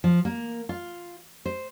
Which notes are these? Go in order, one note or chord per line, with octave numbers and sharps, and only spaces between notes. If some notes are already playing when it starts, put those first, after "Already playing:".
F3
A#3
F4
C5